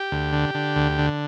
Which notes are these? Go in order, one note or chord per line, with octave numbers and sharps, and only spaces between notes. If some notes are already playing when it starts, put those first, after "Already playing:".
Already playing: G4
D2
D3
D3
D2
D3